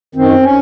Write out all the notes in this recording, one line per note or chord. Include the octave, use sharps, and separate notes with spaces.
F#2 D#3 C4
C#4